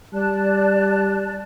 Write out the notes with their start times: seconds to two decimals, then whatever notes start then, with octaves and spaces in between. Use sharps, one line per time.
0.13 G3 D5 A5 F#6